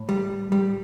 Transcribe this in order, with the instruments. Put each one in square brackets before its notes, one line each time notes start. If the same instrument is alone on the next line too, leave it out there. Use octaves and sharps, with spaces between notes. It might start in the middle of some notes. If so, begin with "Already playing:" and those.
Already playing: [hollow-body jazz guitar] A2
G3
G3